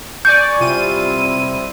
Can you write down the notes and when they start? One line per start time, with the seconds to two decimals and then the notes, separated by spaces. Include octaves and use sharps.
0.25 D5 G#5 C#6 G6
0.60 C3 G3 C4 E4 F4 D#7